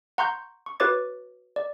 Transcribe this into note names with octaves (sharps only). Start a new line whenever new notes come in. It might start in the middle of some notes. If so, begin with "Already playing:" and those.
F#5 A#5 C6 C#6 G6
C#6
F#4 B4 C#5 D6 A6
D5